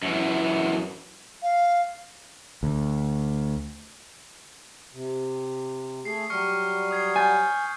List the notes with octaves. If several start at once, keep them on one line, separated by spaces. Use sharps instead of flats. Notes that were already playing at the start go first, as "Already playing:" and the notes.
F#2 E3
F5
D2
C3
A3 G#4 C7
F#3 G3 C#6 F6 C#7
D#6 G#6 C7
G#5 F6 G6 A6